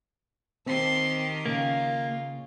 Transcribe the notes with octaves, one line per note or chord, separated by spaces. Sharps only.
D#3 C4 G4 A#4 A5 C6
C#3 A#3 F4